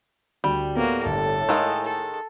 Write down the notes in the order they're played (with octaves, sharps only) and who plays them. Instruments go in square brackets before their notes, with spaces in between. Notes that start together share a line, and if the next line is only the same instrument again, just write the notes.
[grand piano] D2 [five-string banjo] G3
[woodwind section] A2 [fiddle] A#3 F#4 [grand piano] B3
[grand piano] G1 [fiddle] A4
[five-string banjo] D#3 G#3 D#4 [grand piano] F5 E6
[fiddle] A4